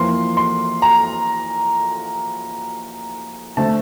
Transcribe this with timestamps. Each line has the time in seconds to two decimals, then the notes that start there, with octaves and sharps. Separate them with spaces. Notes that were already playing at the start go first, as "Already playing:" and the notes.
Already playing: F2 E3 A#3 C6
0.37 C6
0.82 A#5
3.57 D3 A3 C4 A5